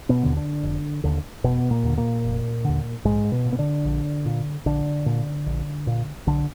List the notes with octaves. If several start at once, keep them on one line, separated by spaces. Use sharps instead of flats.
B2 B3
D#2 D3
D3 D4
F1
D#2 D3
F1 B2 B3
A#2 A#3
D#2 D3
A#2 A#3
F1
D#2 D3
A#1 G#2 G#3
B2 B3
A#2
B3
D3 D4
A#1
A#2
A#1 D3 D4
A#2
A#1
A#2
B1 D3 D4